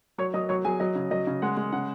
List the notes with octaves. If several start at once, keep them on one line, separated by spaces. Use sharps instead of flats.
F#3 C#5 C#6
F#3 D#5 D#6
F#3 C#5 C#6
F#3 G#4 G#5
F#3 D#5
C#3
F#3 D#5
C#3
G#3 F#5
G#3
C#3 F#5